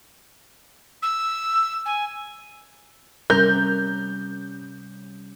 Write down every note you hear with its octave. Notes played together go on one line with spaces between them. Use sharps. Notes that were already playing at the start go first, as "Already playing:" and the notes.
E6
G#5
C3 G3 C#4 A#4 G6